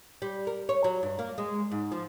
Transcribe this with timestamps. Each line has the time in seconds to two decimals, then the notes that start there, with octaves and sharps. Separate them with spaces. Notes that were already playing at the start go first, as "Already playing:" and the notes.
0.22 G3
0.47 A#4
0.69 C#5
0.84 F#3
1.03 G2
1.19 A#3
1.38 G#3
1.71 G#2
1.92 F3